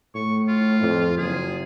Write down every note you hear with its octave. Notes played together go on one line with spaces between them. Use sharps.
A2 C#6
F4
F2
F#1 G#4